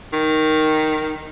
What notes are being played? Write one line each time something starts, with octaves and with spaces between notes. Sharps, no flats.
D#3